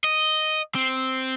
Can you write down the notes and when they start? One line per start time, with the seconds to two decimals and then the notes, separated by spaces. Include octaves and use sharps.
0.04 D#5
0.75 C4